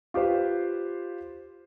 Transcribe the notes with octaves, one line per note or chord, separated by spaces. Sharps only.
F4 G4 B4 C5